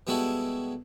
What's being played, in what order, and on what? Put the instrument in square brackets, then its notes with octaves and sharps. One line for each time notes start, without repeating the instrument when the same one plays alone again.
[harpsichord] B2 G3 G#3 E4 F#4 A4